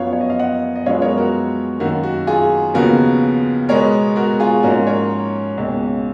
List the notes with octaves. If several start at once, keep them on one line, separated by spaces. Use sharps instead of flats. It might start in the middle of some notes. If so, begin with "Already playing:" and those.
Already playing: F#2 F3 B3 C#5 F5
C#5
D#5
F5
D#5 F#5
D#5
F#2 F3 G#3 B3 C#5 F5
A#4 C#5
F#4 A#4
F#2 D#3 A#3 F#4
F#4
F4 G#4
D#2 C#3 F3 B3 F#4 A#4
B2 G#3 B3 A#4 C#5
F#4 A#4
F4 G#4
G#2 F3 A#3 C#4 F#4 A#4
A#4 C#5
C#2 B2 A#3 C#4